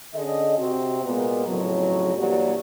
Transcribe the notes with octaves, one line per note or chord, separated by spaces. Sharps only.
D3 C#4 G#4 D#5
C3 C4 F#4
A#2 G#3 A#3 B3
F2 A2 C#3 F#3
G2 E3 F#3 A#3 G4 D5